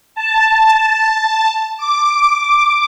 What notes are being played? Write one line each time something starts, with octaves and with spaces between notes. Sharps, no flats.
A5
D6